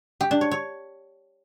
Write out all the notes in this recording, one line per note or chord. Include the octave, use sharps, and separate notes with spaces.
G4
D4
C#5
C#5